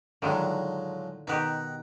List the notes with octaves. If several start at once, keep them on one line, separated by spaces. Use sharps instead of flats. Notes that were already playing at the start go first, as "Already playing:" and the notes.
A2 D3 D#3 F3 F#3 G#3
B2 D#3 D#4 G4 F#5